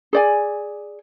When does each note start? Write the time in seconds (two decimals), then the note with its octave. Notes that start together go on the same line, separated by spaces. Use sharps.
0.13 G#4 D5 G#5